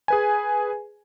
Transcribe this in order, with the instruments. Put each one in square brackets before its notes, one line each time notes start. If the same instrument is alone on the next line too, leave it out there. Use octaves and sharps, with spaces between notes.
[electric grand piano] G#4 B4 G#5